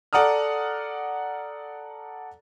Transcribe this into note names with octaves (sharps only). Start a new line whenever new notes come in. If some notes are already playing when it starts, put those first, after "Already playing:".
A4 D5 F#5 A#5 D#6 F6